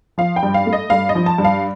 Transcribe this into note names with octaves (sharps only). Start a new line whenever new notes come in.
F3 F5
G5
G2
F5
A3
D#5
G2 F5
D#5
F3
A5
G2
F5